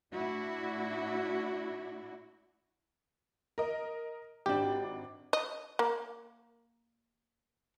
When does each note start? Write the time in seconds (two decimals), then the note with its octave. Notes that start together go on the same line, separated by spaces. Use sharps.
0.13 A2 D4 E4 F#4
3.58 A#4 D#5
4.46 G#1 D4 G4
5.33 D#5
5.79 A#3